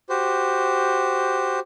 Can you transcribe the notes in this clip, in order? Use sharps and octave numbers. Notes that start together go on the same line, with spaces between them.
F#4 G4 C5